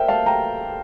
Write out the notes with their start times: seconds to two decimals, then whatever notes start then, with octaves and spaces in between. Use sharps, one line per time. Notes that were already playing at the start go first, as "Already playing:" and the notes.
Already playing: A#4 C5 D5 E5 G5
0.08 F5 A5
0.26 G5 A#5